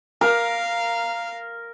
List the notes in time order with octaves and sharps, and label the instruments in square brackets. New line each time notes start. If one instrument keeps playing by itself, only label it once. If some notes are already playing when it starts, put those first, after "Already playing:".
[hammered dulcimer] A#4 [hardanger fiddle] F5